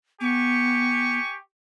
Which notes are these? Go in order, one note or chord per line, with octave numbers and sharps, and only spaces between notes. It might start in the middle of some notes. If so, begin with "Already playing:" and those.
B3 G4 G#5 C#6